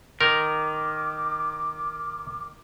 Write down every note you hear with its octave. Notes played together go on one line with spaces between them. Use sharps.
D#3 A#4 D6